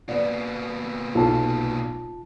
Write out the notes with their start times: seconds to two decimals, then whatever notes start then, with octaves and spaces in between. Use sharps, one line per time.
0.09 A#2 B3 D5
1.15 B1 F4 A5